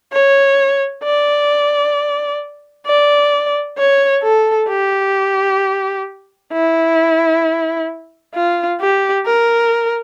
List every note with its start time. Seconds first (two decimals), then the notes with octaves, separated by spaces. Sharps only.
0.12 C#5
1.03 D5
2.86 D5
3.78 C#5
4.23 A4
4.68 G4
6.52 E4
8.34 F4
8.80 G4
9.25 A#4